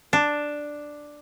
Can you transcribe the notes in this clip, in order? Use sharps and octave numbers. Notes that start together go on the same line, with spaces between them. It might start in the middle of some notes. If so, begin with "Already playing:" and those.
D4